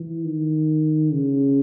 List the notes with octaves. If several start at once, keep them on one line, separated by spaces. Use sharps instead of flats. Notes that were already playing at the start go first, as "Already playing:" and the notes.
Already playing: E3
D#3
C#3